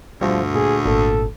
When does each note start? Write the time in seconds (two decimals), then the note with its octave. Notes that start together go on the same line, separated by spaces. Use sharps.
0.21 D2 G2 B2 F3 G3
0.54 A#2 G#4
0.85 G#1 A#2 A4